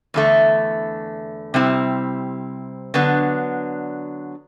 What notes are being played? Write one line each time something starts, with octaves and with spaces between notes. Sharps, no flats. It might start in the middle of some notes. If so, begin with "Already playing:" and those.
E2 D3 A3
C3 G3 C4 E4
D3 F#3 B3 D4